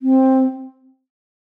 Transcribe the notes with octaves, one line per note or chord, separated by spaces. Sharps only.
C4